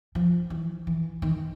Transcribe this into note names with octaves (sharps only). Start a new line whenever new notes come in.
F3
E3
E3
D#3